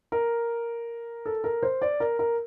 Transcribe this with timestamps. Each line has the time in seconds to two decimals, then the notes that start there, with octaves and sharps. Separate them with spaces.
0.12 A#4
1.26 A4
1.44 A#4
1.63 C5
1.82 D5
2.00 A#4
2.19 A#4